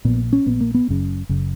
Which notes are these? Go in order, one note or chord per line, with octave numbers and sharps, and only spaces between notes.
A#1 A#2 B3
C#4
A#1 A#2 B3
A#3
B3
F#1 F#2 C#3
F#1 F#2 C#3